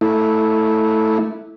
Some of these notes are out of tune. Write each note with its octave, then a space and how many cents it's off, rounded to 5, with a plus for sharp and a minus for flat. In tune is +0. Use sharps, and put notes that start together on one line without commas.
A3 +0 E4 -20